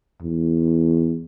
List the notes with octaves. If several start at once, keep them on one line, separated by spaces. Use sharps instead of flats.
E2